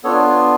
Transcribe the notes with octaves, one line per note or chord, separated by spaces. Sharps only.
B3 D4 F4 A4 C#5